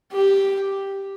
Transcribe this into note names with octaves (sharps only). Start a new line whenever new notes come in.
G4